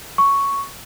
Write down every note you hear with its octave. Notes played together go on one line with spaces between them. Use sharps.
C#6